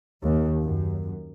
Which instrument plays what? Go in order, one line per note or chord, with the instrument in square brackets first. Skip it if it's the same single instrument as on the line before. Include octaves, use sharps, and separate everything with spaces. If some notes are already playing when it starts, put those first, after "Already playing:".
[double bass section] D#2
F#2